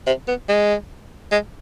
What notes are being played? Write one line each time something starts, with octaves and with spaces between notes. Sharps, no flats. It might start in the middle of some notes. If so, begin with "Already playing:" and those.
C3
B3
G#3
G#3